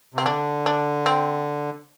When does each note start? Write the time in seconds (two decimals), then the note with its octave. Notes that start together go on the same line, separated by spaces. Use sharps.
0.14 C3 C4
0.26 D3 D4
0.66 D4
1.06 C4